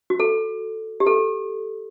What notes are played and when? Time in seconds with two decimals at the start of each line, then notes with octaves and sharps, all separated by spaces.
0.10 F#4
0.20 A4
1.00 G4
1.06 A4